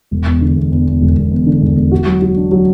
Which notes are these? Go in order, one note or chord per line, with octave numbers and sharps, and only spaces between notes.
E1
E2
D3
E2
E2
E2
E1
E1
E2
D3
E1
E1
F#4
F#3
F#4
D4
F#3